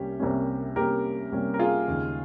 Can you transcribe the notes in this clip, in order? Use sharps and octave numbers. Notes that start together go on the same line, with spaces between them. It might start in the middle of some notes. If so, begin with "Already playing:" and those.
Already playing: C2 C3 G3 A#3 C#4 G4
C2 C3 G3 A#3 C#4
C2 C3 G3 A#3 C#4 G4 A#4
C2 C3 G3 A#3 C#4
A#4
F4 G#4
D#2 C#3 G#3